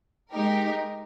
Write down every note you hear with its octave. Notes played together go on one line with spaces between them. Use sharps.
G#3 D#4 G4 A#4